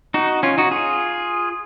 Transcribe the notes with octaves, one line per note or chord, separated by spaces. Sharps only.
D#4 F#4
C#4 F4
D#4 F#4
F4 G#4